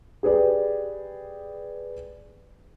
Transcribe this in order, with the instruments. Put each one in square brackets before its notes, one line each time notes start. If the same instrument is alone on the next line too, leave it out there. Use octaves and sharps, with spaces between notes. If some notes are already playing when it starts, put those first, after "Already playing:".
[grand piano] G4 G#4 B4 D5 G5